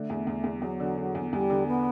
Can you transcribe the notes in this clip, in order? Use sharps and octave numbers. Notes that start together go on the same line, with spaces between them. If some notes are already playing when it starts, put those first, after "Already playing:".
Already playing: D3 A3
E2
E2
E2
G3
E2 F#3
D3
D3
E2
E2 G3
D3
B3